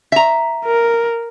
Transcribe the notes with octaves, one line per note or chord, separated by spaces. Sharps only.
E5 A#5
A#4